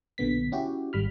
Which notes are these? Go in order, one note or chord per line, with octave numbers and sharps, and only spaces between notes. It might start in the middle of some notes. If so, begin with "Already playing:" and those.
B1 A#2 D3 B3 B6
C#4 E4 F#4 G4
G#1 G3 B5 F6